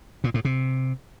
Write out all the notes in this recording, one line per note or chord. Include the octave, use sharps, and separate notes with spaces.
A#2
A2
C3